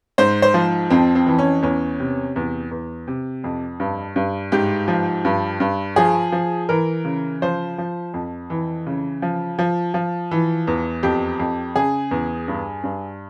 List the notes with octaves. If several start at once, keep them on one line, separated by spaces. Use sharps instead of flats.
G#2 C5
C5
F3
F2 C4
C4
E3
C#4
E2 C#4
C3
E2
E2
C3
F2
G2
G2
G#2 G4
F3
G2
G2
F3 G#4
F3
E3 A#4
C#3
F3 C5
F3
F2
E3
C#3
F3
F3
F3
E3
E2
F2 G4
F2
C#3 G#4
E2
G2
G2